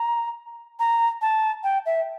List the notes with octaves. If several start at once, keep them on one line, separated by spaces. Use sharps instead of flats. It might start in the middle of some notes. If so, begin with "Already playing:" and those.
Already playing: A#5
A#5
A5
G5
E5